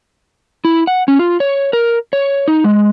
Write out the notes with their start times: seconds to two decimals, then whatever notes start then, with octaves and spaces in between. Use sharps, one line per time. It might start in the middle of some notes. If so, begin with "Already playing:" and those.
0.65 E4
0.87 F#5
1.08 C#4
1.19 F4
1.40 C#5
1.73 A#4
2.13 C#5
2.48 D#4
2.64 G#3